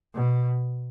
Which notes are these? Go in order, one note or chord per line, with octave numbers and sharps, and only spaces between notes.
B2